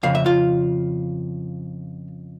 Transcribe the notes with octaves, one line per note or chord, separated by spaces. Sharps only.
F2 C#3 F5
E5
F4 F5